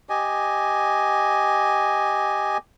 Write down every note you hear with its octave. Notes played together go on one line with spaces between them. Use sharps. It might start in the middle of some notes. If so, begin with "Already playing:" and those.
G4 D#5 G#5